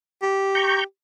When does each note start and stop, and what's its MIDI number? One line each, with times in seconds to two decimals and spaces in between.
0.22 0.82 67
0.55 0.84 82
0.55 0.84 85
0.55 0.84 91